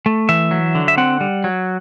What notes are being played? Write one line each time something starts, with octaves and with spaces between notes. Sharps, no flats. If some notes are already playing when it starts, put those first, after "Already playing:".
A3
E3 E5
F#3
D3
E5
C4 F#5
G3
F#3